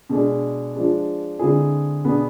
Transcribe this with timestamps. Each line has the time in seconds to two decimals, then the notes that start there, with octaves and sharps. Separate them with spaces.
0.09 B2 G#3 D4 G#4
0.75 F3 G#3 D4
1.39 D3 G#3 C4 E4 G#4
2.05 B2 B3 D4 G#4